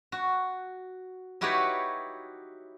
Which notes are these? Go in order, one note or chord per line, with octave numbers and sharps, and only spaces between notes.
F#4
D#4 E4 F#4 G4 B4 C#5